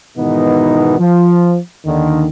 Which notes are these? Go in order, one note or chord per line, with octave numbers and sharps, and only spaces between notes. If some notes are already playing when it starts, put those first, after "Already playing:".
G#2 B2 D#3 E3 B3 D#4
F3
D#2 D3 D#3